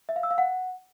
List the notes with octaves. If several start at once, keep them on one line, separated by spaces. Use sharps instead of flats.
E5
F5
E6
F5
F#5